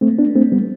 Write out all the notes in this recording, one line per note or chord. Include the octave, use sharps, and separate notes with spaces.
A3 C4
B3 D4
A3 C4
G3 B3